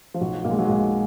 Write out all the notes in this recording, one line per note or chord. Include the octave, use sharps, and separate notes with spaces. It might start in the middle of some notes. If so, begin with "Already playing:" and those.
F3
B1 F#3
B1 A#3
G#3
F#3
B1 G#3